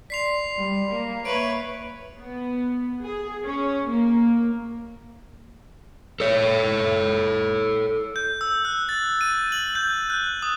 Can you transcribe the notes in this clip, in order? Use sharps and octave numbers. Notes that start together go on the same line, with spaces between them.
D5 C6 B6 C7 F7
G3
A#3
A#3 B4 C#5 E5 D7
B3
G#4
C#4
A#3
A4 C#5
G6
E6
F#6
A6
D#7
F#7
G6
F#6
D#6